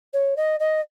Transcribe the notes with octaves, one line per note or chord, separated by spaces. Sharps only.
C#5
D#5
D#5